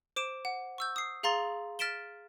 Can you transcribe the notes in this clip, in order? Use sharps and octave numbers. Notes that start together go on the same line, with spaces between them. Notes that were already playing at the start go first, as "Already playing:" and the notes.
C5 D6 D7 E7
F#5
C#6 E6 G6
D#6 C7
G#4 F5 A#5 C6 A6
F6 A6 B6 D7 E7 G7